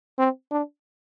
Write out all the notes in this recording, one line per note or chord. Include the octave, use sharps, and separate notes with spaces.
C4
D4